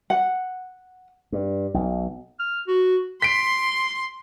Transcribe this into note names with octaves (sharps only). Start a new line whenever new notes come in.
F#5
G2
B1
F6
F#4
C6 B6 D7